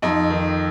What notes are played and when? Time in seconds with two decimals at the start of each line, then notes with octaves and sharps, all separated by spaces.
0.02 F2 D#4
0.30 D#3